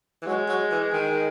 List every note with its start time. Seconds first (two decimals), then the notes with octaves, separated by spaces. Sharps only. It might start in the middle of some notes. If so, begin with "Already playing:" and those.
0.22 E3
0.27 F#3 G#3
0.49 F#3
0.71 E3
0.93 D#3